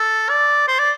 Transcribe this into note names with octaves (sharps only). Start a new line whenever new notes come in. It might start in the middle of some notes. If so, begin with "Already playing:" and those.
Already playing: A4
D5
C5
D5